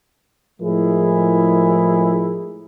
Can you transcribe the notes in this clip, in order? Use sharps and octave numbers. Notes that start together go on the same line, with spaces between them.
A2 F3 G#3 E4 G#4 A#4